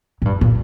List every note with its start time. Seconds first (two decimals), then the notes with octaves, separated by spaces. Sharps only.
0.22 A#2
0.25 G2
0.41 A#2